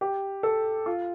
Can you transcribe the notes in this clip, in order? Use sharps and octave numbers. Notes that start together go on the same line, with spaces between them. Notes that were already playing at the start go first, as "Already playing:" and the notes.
G4
A4
F4